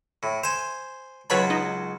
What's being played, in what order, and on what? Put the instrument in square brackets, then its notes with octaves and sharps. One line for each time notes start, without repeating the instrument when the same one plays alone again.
[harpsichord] A2
[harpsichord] C5 G#5 [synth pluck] E7
[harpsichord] C#2 F#3 A5 [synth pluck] B4 C#5 B5
[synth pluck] D#4